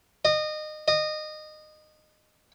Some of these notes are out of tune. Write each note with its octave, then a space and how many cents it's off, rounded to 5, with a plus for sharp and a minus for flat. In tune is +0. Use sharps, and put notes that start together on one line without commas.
D#5 -25
D#5 -20